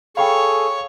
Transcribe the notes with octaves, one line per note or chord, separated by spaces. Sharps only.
G#4 A4 C#5 F5 G5 B5 C#6